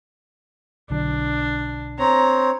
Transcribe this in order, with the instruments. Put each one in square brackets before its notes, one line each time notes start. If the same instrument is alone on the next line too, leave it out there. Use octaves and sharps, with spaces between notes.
[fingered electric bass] B1 D3 F#3 [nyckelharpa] D4
[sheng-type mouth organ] C4 C#5 [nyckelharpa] A#5